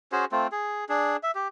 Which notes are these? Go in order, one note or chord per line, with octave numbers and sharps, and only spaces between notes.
C#4 F#4 G#4 C5
A3 C4 F4
G#4
D4 G#4
E5
G4